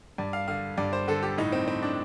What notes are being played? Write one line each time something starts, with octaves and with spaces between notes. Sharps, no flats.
G2 D5
F5
D3 F5
G2 D5
C5
D3 A4
G4
A2 D#4
C4
A2 C4
D4